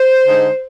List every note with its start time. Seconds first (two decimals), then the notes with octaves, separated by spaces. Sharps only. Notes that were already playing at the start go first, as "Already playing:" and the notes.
Already playing: C5
0.27 D3 G#3 D#4